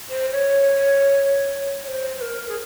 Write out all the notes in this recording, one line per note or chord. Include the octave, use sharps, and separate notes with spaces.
C5
C#5
C#5
C5
C5
A#4
G#4